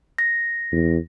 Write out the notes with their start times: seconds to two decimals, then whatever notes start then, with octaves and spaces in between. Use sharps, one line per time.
0.18 A#6
0.72 E2